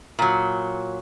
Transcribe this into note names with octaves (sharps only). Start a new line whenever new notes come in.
A#2 F#3